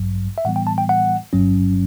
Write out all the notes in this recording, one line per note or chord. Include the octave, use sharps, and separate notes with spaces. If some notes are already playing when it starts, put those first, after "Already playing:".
Already playing: A1 G2 F#3
E5
A2 E3 G3 B3 F#5
G5
A5
G5
F#5
G1 G2 F#3 C#4